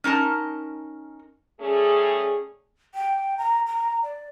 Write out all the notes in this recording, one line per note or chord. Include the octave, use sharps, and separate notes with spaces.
C#4 D#4 A#4 A5
G3 A3 C#4 G#4
G5
A#5
A#5
D5